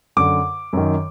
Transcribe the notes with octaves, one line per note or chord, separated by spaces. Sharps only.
F#2 D3 D6
F#2 D#3